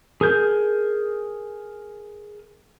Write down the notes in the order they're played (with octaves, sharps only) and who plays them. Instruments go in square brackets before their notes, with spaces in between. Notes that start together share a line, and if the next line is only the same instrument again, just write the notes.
[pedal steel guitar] G#4 A#4 G6